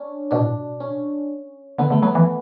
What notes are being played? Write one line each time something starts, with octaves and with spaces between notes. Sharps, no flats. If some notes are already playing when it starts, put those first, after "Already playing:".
Already playing: C#4 D4
B2 D4
A2
B2
C#4
D3 B3
D3 A3
F#3 B3
E3